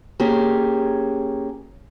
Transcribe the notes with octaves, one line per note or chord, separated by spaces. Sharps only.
A#3 C#4 G4 G#4